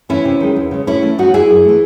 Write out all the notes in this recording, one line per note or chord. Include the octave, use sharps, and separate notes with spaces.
E3 A3 C#4 E4
C3
D#3 G#3
E2
C#3 G#3
A2 C#4 E4
E3 A3
A2 D#4 F#4
G#3 E4 G#4
F#2
E3 A3